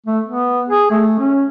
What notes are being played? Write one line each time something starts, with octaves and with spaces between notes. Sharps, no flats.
A3
B3
G#4
A3
C#4